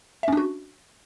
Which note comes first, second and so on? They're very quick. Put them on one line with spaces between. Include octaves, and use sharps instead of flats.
E5 C#4 D4 F#4